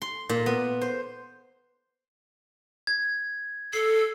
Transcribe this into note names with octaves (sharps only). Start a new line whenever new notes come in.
C6
A#2
B3
C5
G#6
A4 C7